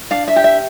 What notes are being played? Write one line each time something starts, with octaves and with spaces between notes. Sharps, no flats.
D4 F5
E5
G4
E5